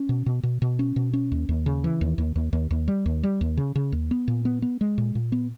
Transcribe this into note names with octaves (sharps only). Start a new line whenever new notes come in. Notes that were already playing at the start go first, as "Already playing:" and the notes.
Already playing: C#4
B2
B2
B2
B2
C#4
B2
C#4
D#2
D#2
C#3
E3
D#2
D#2
D#2
D#2
D#2
G3
D#2
G3
D#2
C#3
C#3
D#2
B3
A#2
B3
B3
G#3
A#2
A#2
B3